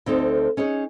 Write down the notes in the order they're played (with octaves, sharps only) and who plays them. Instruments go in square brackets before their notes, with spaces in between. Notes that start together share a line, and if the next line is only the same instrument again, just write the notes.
[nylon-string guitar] D2 C4 D#4 A4
C#4 D#4 G#4 C#5